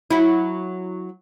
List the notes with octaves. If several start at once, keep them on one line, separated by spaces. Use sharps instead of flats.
F#3 E4